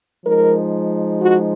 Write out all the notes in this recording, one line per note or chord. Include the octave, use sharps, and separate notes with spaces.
F3 G#3 D#4 A#4
F#4